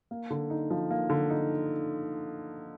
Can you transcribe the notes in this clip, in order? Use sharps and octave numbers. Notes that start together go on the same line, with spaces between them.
A#3
D3
D#4
F3
A#3
D3
D#4